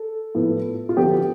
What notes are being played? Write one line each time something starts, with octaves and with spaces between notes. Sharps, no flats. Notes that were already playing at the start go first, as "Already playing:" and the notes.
Already playing: A4
A2 F3 B3
F4
D3 F3 B3 G4